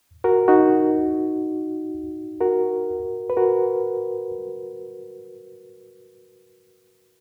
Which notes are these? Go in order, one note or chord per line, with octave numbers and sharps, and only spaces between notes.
F#4 A#4
D#4 F#4
F#4 A#4
B4
F#4 A#4